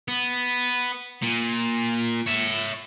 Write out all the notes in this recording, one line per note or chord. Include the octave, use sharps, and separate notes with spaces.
B3
A#2
C#5 E5